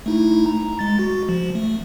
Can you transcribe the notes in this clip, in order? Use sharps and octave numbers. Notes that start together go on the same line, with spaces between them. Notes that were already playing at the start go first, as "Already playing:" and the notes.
A3 D#4 E4
A#5
G#3 A6
F#4
F3
A3